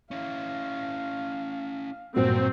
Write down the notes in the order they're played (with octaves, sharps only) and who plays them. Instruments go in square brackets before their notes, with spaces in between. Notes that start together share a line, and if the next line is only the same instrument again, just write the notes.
[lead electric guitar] C#4 E4 [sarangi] F5
[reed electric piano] G2 A#2 F#4 [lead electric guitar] F3 F#3 [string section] C4